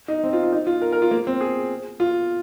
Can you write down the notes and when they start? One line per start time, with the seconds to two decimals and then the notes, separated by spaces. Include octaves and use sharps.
0.08 D#4
0.24 C4
0.33 F4
0.43 F4
0.52 D#4
0.67 F4
0.82 A#4
0.92 A#4
1.02 F4
1.11 A#3
1.27 C4
1.41 G#4
2.00 F4